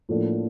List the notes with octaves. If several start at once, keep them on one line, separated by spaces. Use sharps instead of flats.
A2 F3 A#3 D4 A4